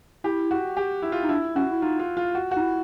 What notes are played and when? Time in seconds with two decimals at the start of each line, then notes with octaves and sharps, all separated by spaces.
0.24 E4 G4
0.51 F#4
0.77 G4
1.02 E4
1.12 F4
1.23 D#4
1.29 D4 E4
1.55 C#4 F#4
1.71 E4
1.82 D#4 F4
1.99 F4
2.17 F4
2.35 F#4
2.51 D#4 F#4
2.61 E4